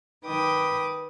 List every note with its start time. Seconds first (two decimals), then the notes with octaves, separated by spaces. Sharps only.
0.25 D#3 B4 G5 D6 D#6